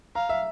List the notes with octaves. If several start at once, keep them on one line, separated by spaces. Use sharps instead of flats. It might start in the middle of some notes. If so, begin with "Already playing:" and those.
F5 A#5
E5